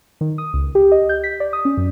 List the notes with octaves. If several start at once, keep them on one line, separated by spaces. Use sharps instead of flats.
D#3
D#6
C#2
G4
D#5
G6
B6
D5
D#6
C#4
F#2